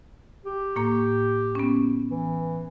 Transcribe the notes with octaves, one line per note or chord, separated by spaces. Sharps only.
G4
A2 A#3 A#5
B3 C#4
E3